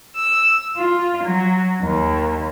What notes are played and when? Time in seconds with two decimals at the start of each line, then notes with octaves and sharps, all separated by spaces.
0.15 E6
0.77 F4
1.24 F#3
1.81 D#2